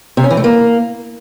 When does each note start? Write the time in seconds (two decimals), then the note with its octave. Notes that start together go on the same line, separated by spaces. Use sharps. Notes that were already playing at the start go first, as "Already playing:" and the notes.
0.17 C3
0.24 C#4
0.30 E3
0.37 A3
0.44 A#3